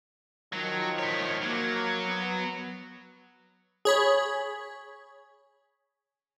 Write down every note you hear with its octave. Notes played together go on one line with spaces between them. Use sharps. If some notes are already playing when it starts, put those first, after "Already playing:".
D#3 F3 F#3
E4 C#5
F#3 A#3
B3
G#4 C#5 B5